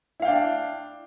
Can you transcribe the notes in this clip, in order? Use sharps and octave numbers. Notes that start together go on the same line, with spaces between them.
D4 E4 F5 G5